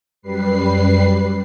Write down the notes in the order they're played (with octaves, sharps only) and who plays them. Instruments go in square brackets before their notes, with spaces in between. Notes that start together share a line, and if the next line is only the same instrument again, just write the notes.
[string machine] F#2 G3 B4 C7